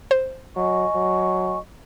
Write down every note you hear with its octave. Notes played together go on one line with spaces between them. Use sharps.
C5
F#3 D#5 G#5 C#6
F#3